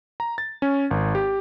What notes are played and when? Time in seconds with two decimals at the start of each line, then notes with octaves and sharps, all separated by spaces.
0.20 A#5
0.38 A6
0.62 C#4
0.91 G#1
1.15 G4